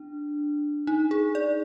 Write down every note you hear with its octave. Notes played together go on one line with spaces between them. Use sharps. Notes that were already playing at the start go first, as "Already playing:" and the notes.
Already playing: D4
D#4
G#4
D5